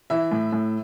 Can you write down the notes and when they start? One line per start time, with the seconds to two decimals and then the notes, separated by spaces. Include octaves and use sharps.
0.10 E3 E5
0.32 A2
0.52 A2